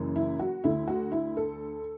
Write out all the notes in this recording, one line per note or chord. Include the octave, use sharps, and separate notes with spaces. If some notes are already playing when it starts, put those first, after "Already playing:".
Already playing: F#1 F#2 E3
E4
F#4
D2 D3 E4
F#4
E4
A4